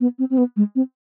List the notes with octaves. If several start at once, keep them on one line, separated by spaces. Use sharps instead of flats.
B3
C4
C4
B3
G#3
C4